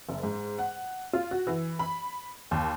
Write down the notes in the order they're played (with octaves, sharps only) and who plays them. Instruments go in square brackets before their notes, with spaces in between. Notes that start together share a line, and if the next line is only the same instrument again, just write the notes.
[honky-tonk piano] F#1
G#2
F#5
F4
F#4
E3
B5
D#2